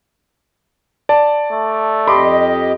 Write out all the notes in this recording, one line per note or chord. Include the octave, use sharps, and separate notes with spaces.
D5 A5
A3
F2 G4 D#5 B5 C6 D6